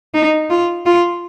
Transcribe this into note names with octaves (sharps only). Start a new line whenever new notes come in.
D#4
F4
F4